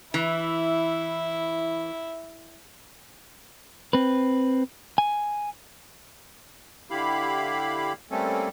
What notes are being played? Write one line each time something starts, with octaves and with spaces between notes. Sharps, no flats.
E3 E4
C4 B4
G#5
D3 E4 G4 F5 B5
G3 A3 A#3 C4 C#4 A4